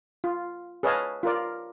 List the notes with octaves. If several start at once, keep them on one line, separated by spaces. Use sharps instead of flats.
F4
G#4 B4 C#5 D#5 F5 A5
F4 A#4 D5